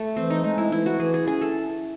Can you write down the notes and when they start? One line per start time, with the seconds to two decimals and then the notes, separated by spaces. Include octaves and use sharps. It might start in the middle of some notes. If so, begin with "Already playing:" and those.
Already playing: A3
0.16 E3 C4
0.30 D#4
0.44 G#3 D#4
0.58 E4
0.72 E3 E4
0.86 F#4
0.99 E3 G#4
1.14 G#4
1.27 C#4 G#4
1.41 A4